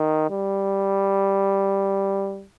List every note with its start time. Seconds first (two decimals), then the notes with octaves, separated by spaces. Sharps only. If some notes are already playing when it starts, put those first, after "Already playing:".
Already playing: D#3
0.30 G3